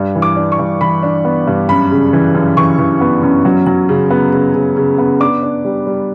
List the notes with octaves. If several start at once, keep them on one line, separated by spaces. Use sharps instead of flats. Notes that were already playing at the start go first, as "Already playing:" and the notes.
Already playing: G2
E3
D6
D4
C#6
G2
E3 B5
D4
B3
G2
F#2 B5
C#3
E3
F#2
E3 C#6
E3
B3
F#2
F#3
F#3
C#3
B3
C#3
C#3
C#3
B3
D4 D6
D4
G3
G3